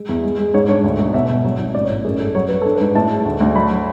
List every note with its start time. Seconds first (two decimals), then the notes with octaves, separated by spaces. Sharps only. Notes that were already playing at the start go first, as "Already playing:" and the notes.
Already playing: G#3
0.09 E2
0.24 G#3
0.39 G#3
0.54 G#2 C#5
0.68 D4 C#5
0.84 D2
0.99 E1
1.14 B2 E5
1.30 B2
1.44 F#3
1.60 G#1
1.74 A1 D5
1.85 C#5
1.90 A2
2.04 F#2 G#4
2.20 F#2 A4
2.35 F#3 C#5
2.48 F#3 B4
2.62 D4 A4
2.75 B4
2.80 G#2
2.95 A2 A5
3.10 G#3
3.26 D2
3.41 D2
3.55 F#3 B5
3.71 F#3